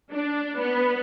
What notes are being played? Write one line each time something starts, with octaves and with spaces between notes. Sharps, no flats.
D4
B3